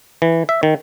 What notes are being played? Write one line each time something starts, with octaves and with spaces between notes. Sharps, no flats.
E3
E5
D#3